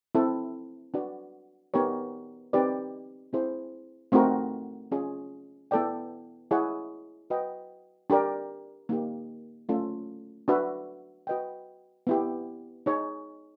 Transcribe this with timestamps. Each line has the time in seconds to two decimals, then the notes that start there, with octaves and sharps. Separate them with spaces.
0.15 C4 E4 A4
0.94 D4 F#4 B4 D5
1.74 B3 D#4 G4 A#4 C#5
2.53 C4 D#4 G4 B4 D5
3.33 C4 E4 G#4 C5
4.12 A3 C4 D#4 F#4 A#4
4.92 C#4 F4 G#4
5.71 B3 E4 A4 D5 G5
6.51 E4 G#4 C#5 F#5
7.30 F#4 B4 D#5 G5
8.10 D4 G4 A#4 D5
8.89 A#3 D#4 G4
9.69 A3 C#4 F4 A4
10.48 D4 F#4 B4 E5
11.27 F#4 B4 D#5 G5
12.07 B3 E4 G4
12.86 D#4 G#4 C#5